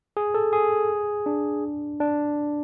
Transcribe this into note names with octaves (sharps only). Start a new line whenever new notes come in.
G#4
A4
G#4
D4
D4